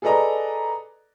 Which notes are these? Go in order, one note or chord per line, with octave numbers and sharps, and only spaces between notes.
G#4 A4 B4 D5 D#5 A#5